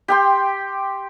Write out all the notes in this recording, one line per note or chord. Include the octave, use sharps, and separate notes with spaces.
G4 G5 C6